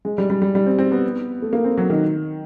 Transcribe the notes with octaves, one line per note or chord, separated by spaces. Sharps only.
G#3
G3
G3
G3
G3
C4
C4
B3
A3
A#3
C4
F#3
D#3